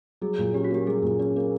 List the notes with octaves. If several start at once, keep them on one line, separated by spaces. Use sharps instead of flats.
F#3 G#4
A#2
C#4 G4
F#4
A#3 G4
F#3 G#4
A#2
C#4
A#3